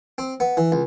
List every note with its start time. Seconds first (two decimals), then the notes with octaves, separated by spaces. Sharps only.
0.18 C4
0.40 B3
0.57 E3
0.72 C#2